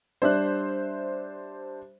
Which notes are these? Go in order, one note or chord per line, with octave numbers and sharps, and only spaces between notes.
G3 D4 C5 D5 E5 F#6